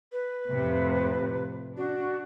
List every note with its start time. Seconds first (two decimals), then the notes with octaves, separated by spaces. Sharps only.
0.12 B4
0.52 F2 A2 C3
1.77 D4 F#4